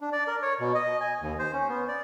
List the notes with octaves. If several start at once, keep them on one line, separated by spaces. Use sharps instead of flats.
D4
D5
A#4
C#5
B2
D#5
G#5
D#2
C5
C#4
B3
D5